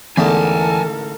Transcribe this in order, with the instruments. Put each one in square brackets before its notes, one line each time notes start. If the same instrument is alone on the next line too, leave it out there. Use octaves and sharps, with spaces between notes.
[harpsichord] A1 G#2 D3 [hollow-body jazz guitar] E2 [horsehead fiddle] A4 A#4 [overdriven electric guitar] G#5 A5